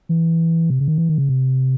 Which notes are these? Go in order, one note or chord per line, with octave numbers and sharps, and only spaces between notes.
E3
C3
C#3
D#3
E3
D#3
C#3
C3